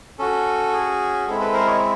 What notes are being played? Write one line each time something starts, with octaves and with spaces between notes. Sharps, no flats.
C#4 F#4 A4
G#4
G#3 C4 E4 A4
A4 B4
A#4 C5
C#5 D#5